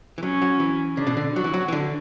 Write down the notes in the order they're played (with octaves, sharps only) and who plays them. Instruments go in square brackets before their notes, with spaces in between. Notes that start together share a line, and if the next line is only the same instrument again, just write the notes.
[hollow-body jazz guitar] E3
[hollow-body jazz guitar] F#3 [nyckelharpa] C#4
[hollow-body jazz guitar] F#3
E3
[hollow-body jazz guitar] C#3 [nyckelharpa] D4
[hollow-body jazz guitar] B2
D3
[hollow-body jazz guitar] F#3 [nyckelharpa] F#4
[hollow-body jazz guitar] E3
F#3
E3
D3